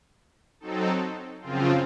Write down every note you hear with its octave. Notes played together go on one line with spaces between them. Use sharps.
F#3 C4 D#4 A4
F#2 C#3 F3 C4 F4